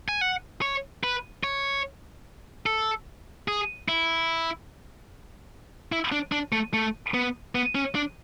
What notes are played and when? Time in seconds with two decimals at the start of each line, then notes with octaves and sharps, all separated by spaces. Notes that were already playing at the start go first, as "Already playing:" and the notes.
0.09 G#5
0.21 F#5
0.62 C#5
1.04 B4
1.44 C#5
2.66 A4
3.48 G#4
3.88 E4
5.92 E4
6.12 D4
6.32 D4
6.52 A3
6.74 A3
7.14 B3
7.55 B3
7.75 C#4
7.95 D4